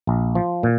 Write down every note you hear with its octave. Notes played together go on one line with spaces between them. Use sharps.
A#1
F3
A#2